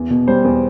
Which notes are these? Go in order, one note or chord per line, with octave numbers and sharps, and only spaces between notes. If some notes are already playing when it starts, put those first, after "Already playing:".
Already playing: E2
B2
G3 C5
E2